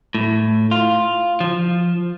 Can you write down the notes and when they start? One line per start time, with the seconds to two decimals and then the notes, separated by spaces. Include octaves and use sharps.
0.15 A2
0.71 F4
1.40 F3